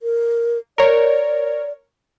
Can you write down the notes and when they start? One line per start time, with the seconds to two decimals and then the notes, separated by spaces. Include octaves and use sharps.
0.02 A#4
0.78 A#4 C#5 D5